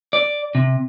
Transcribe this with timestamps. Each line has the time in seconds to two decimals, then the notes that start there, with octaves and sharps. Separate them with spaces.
0.13 D5
0.55 C3